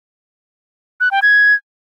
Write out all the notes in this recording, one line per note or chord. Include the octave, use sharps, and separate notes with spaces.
F#6
G5
G#6